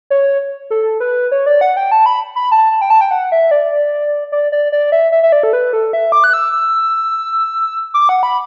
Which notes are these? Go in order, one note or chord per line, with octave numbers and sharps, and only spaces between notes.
C#5
A4
B4
C#5
D5
F#5
G5
A5
B5
B5
A5
G5
A5
G5
F#5
E5
D5
D5
D5
D5
E5
E5
E5
D5
A4
B4
A4
E5
D6
F#6
E6
E6
D6
F#5
B5